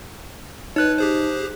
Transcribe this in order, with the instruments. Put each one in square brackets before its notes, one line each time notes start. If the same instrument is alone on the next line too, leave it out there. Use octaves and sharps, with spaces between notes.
[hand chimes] D#4 F#6 [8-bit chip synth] B4 C#5
[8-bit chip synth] G4 G#4 C5